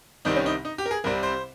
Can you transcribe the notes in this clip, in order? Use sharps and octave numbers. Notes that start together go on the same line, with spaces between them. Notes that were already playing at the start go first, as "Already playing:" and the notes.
C2 C3 D#3 G3 C4 D#4
C#4
D#4
D#4
G4
A#4
G#4
C2 C3 G3 C4 A#4
C5